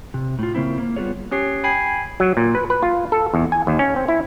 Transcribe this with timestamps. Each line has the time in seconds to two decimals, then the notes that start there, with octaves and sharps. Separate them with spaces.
0.14 C3
0.39 A2 F4
0.55 C#3 A#3 C4 E4
0.78 A#3
0.96 G3 B3 F4 G#4 C#5
1.31 C#4 G4 C#5 C7
1.64 G5 G#5 B5 G#6 C7
2.20 F#3
2.37 A#2
2.55 B4
2.70 B4
2.83 F4
3.12 A4
3.34 E2
3.52 G#5
3.67 D#2
3.79 C#4
3.96 C4
4.08 E4